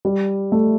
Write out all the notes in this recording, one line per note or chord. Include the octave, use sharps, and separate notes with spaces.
G3
A3